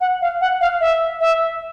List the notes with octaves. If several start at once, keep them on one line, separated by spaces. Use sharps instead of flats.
F#5
F5
F#5
F5
E5
E5